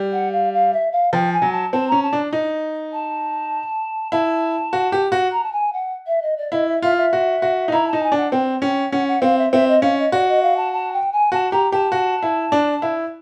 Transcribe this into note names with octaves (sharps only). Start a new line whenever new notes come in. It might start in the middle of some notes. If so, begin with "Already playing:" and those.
Already playing: G3
F#5
F5
F5
E5
F5
F3 G5
G#5
F#3
A5
C4 A5
C#4 A#5
A5
D4
D#4
A5
E4 A5
F#4
G4
F#4
A#5
A5
G#5
F#5
E5
D#5
D5
E4 D#5
E5
F4 E5
E5
F#4
F#4
D#4
E4 A#5
A5
D#4
G#5
D4
F#5
C4 G5
C#4 G5
C#4 F#5
F#5
C4 F5
E5
C4 E5
D#5
C#4 F5
D#5
F#4 D5
D#5
F5
A5
A5
G5
G#5
F#4 A5
G4 A#5
G4 A5
F#4
E4
D4
E4